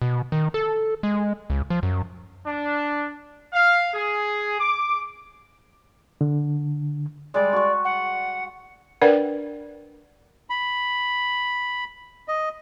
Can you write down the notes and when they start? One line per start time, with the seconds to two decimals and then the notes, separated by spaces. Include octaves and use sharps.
0.02 B2
0.32 D#3
0.54 A4
1.03 G#3
1.50 C#2
1.70 F3
1.83 F#2
2.45 D4
3.53 F5
3.94 G#4
4.60 D6
6.21 D3
7.34 G3 G#3 D5
7.53 F#4 C#6
7.85 F#5
9.01 D4 A#4 B4 D5 F#5 G5
10.50 B5
12.28 D#5